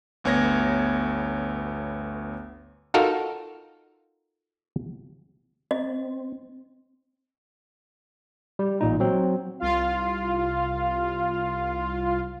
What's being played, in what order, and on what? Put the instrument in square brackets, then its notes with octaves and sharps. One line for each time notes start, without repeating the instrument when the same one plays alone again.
[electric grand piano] G1 D2 B3 C#5 G#6 A#6
[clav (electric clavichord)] D#4 F4 F#4 A4 A#4 F5
[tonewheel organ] C4 [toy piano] D#5
[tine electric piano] G3
A1 A#2 D#4
F#3 C4
[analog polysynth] C2 F4 F5